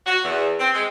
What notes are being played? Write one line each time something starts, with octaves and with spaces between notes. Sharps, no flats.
F#4
E2
C4
G#3